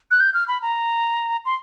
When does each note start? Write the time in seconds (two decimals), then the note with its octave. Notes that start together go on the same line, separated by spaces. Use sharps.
0.11 F#6
0.20 G6
0.34 F6
0.48 B5
0.62 A#5
1.45 C6